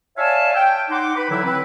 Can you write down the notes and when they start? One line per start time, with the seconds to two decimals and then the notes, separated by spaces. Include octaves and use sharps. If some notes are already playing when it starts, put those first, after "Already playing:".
0.18 C#5 D5 E5 F5 G#5 A5
0.55 G5
0.90 D#4 F#5 C6 D6
1.17 B4 B5
1.30 D3 E3 F#3 G3 E4
1.45 C4 B4